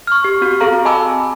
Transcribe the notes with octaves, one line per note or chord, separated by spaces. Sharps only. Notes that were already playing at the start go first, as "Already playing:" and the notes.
C#6 F6
G4
C4 F#4
C4 G#4 A4 F5 A#5
D#5 G#5 A5 B5 D6 E6